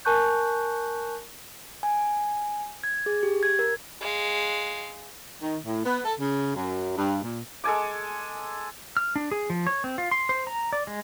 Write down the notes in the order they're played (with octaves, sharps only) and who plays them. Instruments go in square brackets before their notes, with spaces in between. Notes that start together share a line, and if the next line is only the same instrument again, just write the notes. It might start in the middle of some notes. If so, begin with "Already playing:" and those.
[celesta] A#4 G#5 A5 C#6 F#6 G6
[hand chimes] G#5
G#6
G#4
G4
G#6
A#4
[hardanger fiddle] G#3 F5
[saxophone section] D#3
A2
B3
A4
C#3
F#2
G2
A#2
[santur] G#3 A4 G#5 D6
[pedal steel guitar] F6
D4
G#4
F3
C#5
C4
F4
C6
C5
A#5
D5
G#3